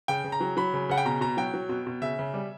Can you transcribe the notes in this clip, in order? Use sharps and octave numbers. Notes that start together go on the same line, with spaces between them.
C#3 G5
C#3
A#5
F#3
F#3 B5
C#3
C#3 F#5
G5
B2 A#5
B2 A#5
F#3 G5
F#3
B2
B2
C#3 E5
C#3
G3